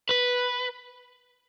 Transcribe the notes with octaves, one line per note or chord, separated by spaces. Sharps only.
B4